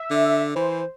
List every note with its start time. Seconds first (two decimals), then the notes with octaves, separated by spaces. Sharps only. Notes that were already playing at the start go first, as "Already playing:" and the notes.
Already playing: E5
0.11 D3
0.55 E3 C5